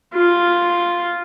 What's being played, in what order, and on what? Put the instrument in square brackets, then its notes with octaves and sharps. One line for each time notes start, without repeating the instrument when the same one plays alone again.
[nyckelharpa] F4